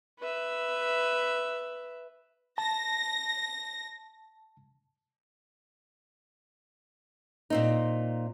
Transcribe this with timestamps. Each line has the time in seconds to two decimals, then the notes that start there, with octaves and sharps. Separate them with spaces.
0.19 B4 E5
2.58 A5 A#6
7.50 A#2 C4 D#4